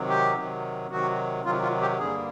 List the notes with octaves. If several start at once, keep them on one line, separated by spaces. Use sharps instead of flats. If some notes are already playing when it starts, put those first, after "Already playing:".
Already playing: C3 D#3 F#3
G4
C3 D#3 F#3
C3 D#3 F#3 F#4
C3 D#3 F#3 F4
F4
G4
G2 D3 G3 A#3 G#4